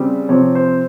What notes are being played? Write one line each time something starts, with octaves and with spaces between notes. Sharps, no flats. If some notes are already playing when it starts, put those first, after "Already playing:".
Already playing: C#3 G3 C4
C3 F3 C4 C#5
C5